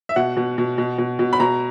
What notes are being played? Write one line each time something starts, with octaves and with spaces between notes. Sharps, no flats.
E5
B2 F#5
B2
B2
B2
B2
B2
B5
B2 A#5